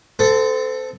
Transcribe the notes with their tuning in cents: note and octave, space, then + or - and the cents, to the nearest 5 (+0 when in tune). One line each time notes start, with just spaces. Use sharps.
C4 -30 A4 +0